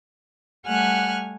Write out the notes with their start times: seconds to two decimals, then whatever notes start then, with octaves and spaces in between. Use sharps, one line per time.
0.67 G3 A3 F#5 G#5 F6 F#6